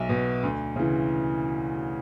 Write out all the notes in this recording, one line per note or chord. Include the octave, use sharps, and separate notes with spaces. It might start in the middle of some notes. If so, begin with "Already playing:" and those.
Already playing: B1 E5
B2
D2
C#3 E3